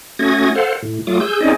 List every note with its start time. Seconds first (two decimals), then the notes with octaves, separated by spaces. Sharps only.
0.19 A3 C#4 F#4 D#6 G#6 A#6
0.55 A4 C5 F5 F#5
0.83 A2
1.07 F#3 A3 F4 D6 D#6
1.20 G#4 E6 G6
1.41 C4 C#4 D#4 G#4 D5 D#5